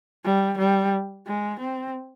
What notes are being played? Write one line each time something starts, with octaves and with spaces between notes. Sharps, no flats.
G3
G3
G#3
C4